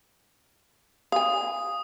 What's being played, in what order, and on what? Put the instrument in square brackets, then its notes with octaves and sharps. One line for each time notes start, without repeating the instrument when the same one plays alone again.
[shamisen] F5 G#5 [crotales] D#6